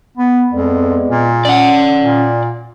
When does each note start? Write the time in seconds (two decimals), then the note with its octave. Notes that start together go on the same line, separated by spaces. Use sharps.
0.17 B3
0.53 F2 G#3 B3 D5
1.09 A#2
1.45 C#4 D5 F#5
2.02 A#2